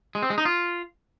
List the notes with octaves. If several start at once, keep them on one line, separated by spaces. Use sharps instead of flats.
G#3
C4
G#3
D#4
F4